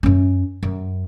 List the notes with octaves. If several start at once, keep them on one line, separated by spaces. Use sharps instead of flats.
F#2 C#4
F#2